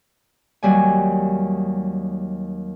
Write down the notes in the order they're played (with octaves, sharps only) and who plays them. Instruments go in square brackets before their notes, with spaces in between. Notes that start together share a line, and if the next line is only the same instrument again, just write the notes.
[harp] D#2 F#3 G3 G#5